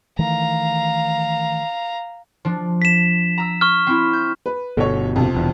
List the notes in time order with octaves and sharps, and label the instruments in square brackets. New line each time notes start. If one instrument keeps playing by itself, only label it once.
[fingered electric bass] D#3 E3 A3 [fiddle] F5 A#5
[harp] F3 D4
[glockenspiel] B6 E7
[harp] A#5 E6
[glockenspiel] C#6 F6
[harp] C4 E4
G6
[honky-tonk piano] B4
[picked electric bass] G1 B2 [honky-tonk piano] A4 C#5
[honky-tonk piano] F2 C3 F3
[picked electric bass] E1 E2